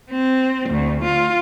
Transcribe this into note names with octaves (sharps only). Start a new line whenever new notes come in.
C4
D2
F4